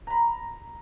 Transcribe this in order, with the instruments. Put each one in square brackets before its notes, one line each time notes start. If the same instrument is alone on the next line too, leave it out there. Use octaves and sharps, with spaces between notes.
[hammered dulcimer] A#5 B5